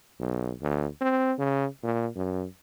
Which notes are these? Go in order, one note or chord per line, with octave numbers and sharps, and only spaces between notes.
B1
D2
C4
C#3
A#2
F#2